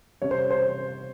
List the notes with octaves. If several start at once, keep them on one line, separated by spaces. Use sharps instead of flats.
C3 G3 C#5
C5
C5